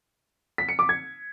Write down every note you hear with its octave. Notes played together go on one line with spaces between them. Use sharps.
B6
C#7
D6
G#6